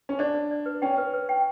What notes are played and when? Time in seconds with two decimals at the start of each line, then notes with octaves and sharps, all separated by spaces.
0.09 C#4
0.19 D4 D5
0.35 D5
0.51 D5
0.66 B4
0.82 C#4 G5
0.98 B4
1.14 B4
1.29 G5